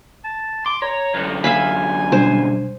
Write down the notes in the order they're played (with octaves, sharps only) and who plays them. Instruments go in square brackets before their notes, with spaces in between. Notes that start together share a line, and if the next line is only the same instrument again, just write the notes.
[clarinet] A5
[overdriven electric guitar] C6 [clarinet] D6
[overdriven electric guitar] C#5 [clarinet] A#5
[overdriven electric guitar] F#2 D3
[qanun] E5 F5 B5 [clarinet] G#5
[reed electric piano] B2 G3 D4 [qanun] C5